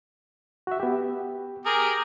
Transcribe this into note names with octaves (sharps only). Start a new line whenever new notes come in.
F#4 E5
B3 G4
G4 G#4 A#4